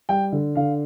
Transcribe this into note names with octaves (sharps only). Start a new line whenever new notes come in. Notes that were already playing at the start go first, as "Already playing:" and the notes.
G3 G5
D3
D3 F5